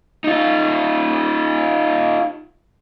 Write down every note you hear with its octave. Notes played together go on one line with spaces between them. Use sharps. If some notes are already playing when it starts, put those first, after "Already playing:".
D#4 F4